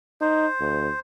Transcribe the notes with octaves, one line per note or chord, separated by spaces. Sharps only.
D#4 C5
D2